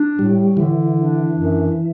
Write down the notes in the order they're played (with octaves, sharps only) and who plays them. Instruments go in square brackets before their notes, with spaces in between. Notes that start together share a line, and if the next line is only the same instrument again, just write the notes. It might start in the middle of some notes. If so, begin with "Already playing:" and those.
Already playing: [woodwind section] D4
[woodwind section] A2 [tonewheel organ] G3
[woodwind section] D3 [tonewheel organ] E3
[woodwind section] D4
F#2